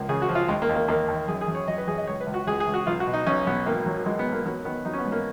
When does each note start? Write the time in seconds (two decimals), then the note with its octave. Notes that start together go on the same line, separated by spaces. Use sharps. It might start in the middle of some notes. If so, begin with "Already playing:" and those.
Already playing: C#2 F3 A#3
0.09 C#3 G#4
0.22 F#4
0.29 F3
0.35 F4
0.48 D#2 G#3
0.62 A#3
0.69 D#2
0.75 A#3
0.88 D#2 A#3
1.08 D#2
1.28 F#2 G#4
1.41 G#4
1.48 F#2
1.55 C#5
1.68 F#2 D#5
1.78 B4
1.88 F#2 G#4
1.98 D#5
2.07 C#2 C#5
2.21 B4
2.27 C#2
2.34 F#4
2.47 C#2 G#4
2.60 G#4
2.67 C#2
2.74 F#4
2.87 B1 F4
3.00 F#4
3.07 B2
3.13 D#4
3.26 B1 C#4
3.46 B1 B3
3.66 G#1 A#3
3.86 F#3
4.06 F#3 G#3
4.19 B3
4.26 G#1
4.32 A#3
4.45 F#3 B3
4.65 D#3 B3
4.85 F#3 D#4
4.93 C#4
4.99 B3
5.05 G#2
5.12 A#3